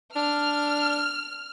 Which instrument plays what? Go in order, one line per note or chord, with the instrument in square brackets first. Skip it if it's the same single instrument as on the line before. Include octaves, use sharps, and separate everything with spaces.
[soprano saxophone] D4 [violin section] F6